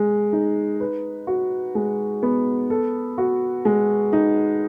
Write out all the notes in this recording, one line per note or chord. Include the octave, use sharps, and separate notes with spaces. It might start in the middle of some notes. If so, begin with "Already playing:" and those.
Already playing: G#3
D#4
B4
F#4
G#3
B3
A4
F#4
G#3
D#4